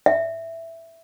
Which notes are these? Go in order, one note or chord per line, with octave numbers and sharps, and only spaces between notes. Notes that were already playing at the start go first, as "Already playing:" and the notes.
E5